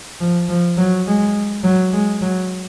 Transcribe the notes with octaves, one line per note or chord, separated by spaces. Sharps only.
F3
F3
F#3
G#3
F#3
G#3
F#3